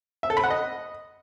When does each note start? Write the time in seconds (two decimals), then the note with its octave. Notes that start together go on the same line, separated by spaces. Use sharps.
0.23 E5
0.30 A4
0.37 B5
0.44 F#5
0.50 D#5